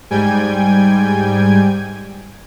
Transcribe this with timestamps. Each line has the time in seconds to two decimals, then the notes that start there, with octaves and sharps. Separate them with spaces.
0.11 G#2 G3 G5 G#5 G#6